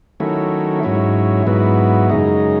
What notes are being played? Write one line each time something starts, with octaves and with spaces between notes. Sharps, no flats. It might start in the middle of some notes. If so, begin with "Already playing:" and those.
D#3 F#3 A3 C#4 E4
G#2 F#3 C#4 E4
G#2 F#3 B3 E4
F#2 C#3 G#3 D#4